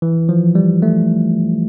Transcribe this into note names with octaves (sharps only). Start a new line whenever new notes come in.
E3
F3
G3
A3